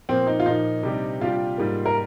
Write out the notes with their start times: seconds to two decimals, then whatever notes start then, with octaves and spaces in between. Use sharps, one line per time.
0.09 A#2 F3 A#3 C4
0.27 D#4
0.40 F4
0.46 A#2 F3 A#3 D#4
0.83 C3 G3 D4 G4
1.20 C3 G3 D4 F4 G4
1.58 G#2 G3 A#3
1.86 A#4